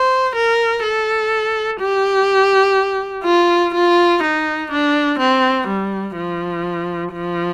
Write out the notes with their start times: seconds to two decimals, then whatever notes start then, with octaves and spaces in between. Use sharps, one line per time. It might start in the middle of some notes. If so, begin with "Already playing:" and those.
Already playing: C5
0.35 A#4
0.83 A4
1.81 G4
3.25 F4
3.74 F4
4.23 D#4
4.71 D4
5.19 C4
5.68 G3
6.16 F3
7.12 F3